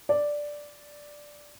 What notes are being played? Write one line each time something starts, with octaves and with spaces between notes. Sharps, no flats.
D5